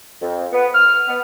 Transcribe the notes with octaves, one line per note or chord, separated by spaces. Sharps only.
F2
B3
F6
B3